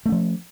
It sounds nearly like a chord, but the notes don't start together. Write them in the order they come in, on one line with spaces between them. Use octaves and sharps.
A3 C#4 F3